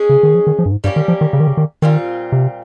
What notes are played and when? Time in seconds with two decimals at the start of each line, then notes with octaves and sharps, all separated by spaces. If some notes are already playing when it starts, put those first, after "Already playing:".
Already playing: G#3 C#4 G#4
0.09 C#3
0.23 D#3
0.35 F3
0.47 D#3
0.59 F3
0.66 G2
0.71 G#2
0.84 G2 G3 A#3 C#4 G4
0.96 D#3
1.08 F3
1.21 D#3
1.33 C#3
1.40 D#3
1.47 C#3
1.57 D#3
1.82 A#2 D#3 G3 C4 F4
2.32 C3